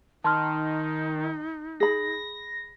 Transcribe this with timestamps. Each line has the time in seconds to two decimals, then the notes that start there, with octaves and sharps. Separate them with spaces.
0.24 D#3 D#4 A5 C6 F6
1.80 G#4 B5 A#6